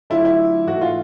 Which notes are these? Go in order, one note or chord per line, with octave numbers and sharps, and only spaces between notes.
D3 F#3 A3 D4 E4 F4
E4
G#2 E3 A3 F#4
F4